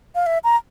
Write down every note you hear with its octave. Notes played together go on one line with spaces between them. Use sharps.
F5
E5
A#5